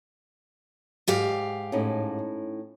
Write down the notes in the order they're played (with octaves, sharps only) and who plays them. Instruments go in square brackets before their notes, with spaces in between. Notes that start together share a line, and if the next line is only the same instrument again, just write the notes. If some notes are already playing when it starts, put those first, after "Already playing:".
[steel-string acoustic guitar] G#2 G4 F5
[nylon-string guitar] A2 C#4 D#4